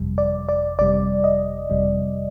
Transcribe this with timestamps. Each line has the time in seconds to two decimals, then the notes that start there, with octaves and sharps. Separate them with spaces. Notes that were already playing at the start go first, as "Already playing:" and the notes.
Already playing: G1 F2 C3 G3
0.18 D5
0.49 D5
0.78 G1 F2 C3 G3 D5
1.24 D#5
1.70 G1 F2 C3 G3